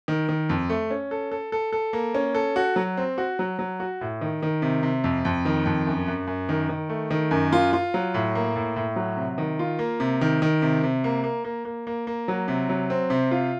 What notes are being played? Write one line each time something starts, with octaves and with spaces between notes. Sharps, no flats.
D#3
D#3
F2
A3
C#4
A4
A4
A4
A4
A#3
C#4
A4
F#4
F#3
C4
F#4
F#3
F#3
F#4
A2
D#3
D#3
C3
C3
F2
F2
D#3
F2
F#2
F#2
F#2
D#3
D#3
A3
D#3
F#2
F4
F4
F#3
A2
A#3
A2
A2
F#3
C3
D#3
F4
A#3
C3
D#3
D#3
C3
C3
A#3
A#3
A#3
A#3
A#3
A#3
F#3
C3
F#3
C4
C3
F4